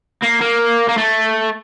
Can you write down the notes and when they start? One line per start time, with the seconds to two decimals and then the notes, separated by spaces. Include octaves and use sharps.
0.22 A#3
0.41 A#3
0.89 A#3
0.98 A3